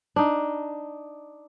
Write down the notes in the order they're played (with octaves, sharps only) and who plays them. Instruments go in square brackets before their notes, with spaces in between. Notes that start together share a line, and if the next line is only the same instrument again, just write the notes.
[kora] D4 D#4